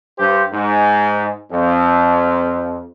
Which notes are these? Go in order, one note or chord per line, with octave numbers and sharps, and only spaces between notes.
G2 G4 C5
G#2
F2